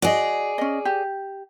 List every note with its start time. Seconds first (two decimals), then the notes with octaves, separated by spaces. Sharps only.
0.02 F#4 G#4 D5 D#5
0.58 C#4 D#5
0.85 G4